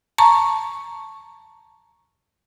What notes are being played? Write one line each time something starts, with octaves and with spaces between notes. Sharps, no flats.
A5 A#5 C#6